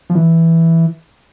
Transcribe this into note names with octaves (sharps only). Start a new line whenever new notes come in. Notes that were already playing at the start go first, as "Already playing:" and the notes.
F3
E3